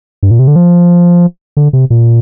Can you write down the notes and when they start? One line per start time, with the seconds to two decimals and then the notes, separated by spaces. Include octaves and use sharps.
0.23 G2
0.31 A#2
0.39 C3
0.48 D3
0.56 F3
1.57 D3
1.73 C3
1.90 A#2